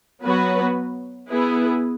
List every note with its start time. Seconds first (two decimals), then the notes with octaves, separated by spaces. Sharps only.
0.24 F#3 B3 F#4 B4
1.29 B3 E4 G#4 B4